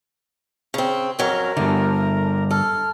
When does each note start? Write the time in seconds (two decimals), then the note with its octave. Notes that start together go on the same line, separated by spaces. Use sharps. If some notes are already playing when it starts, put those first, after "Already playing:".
0.74 C#3 C4
1.19 F2 F#3 C#4 A#4
1.57 G2 D3 A3
2.51 A4 F6